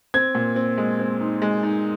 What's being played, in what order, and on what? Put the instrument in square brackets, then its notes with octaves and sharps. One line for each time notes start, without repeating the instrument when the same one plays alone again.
[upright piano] C4 G#6
A#2
C4
G#3
C4
D#4
G#3
D#4